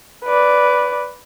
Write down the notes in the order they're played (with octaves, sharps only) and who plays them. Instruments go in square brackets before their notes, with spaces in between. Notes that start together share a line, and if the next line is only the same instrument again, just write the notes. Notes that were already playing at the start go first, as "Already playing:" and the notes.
[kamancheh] B4 D5